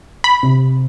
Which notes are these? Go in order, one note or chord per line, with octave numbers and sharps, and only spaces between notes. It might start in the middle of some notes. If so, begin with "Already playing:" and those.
B5
C3